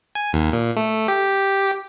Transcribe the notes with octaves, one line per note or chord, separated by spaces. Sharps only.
G#5
D#2
A#2
A3
G4